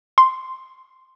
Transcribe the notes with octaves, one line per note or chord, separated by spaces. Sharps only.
C6